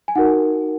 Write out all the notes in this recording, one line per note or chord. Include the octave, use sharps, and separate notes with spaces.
G#5
D#4 F#4 A#4 F#5